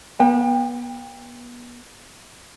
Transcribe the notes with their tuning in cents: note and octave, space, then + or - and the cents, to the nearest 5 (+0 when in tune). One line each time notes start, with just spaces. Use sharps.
B3 -30 G5 +30